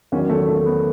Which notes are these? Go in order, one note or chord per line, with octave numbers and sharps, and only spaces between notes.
E2 D#3 F#3 C#4
A3
A3
B3